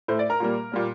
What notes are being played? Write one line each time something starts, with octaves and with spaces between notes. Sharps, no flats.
A2 A3 C5
D5
A#4 A#5
A#2 G3 A#3
A#2 G3 A#3